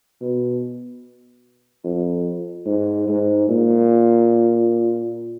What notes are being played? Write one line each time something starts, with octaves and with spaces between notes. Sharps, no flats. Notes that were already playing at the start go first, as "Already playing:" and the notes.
B2
F2
G#2
G#2
A#2